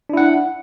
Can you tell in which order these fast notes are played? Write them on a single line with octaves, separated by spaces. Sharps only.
D4 E4 F#5